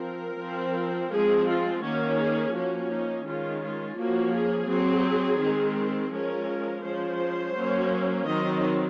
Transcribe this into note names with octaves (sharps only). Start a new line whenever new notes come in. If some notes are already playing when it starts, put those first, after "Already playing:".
Already playing: F3 C4 A#4
F3 C4
F3 G#3 C4 G#4
F4
D#3 A#3 C#4 F#4
G#4
F3 A#3 C#4 F#4
D#4
D#3 G#3 C#4 F4
F4
F3 A#3 C#4 F#4
G#4
F#3 C4
D#3 G#3 C4
F3 G#3 C#4 A#4
F3 G#3 C#4 C5
F#3 A#3 C#4
D#3 F#3 C4 D#5